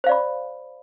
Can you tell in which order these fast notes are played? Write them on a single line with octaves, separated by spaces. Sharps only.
C5 F5 D5 B5